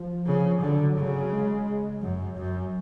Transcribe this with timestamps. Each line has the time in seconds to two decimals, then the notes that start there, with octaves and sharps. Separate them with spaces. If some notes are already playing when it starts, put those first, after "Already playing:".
Already playing: F3
0.26 C#3
0.61 D3 F#3
0.97 C#3
1.32 G#3
2.02 F#2 F#3
2.37 F#2